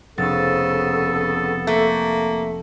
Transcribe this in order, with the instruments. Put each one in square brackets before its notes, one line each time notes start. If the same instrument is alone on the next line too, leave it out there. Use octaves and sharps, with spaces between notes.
[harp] F1 A6 [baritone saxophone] C#3 [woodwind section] B3 A4
[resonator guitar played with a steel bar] A3 [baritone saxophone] A#3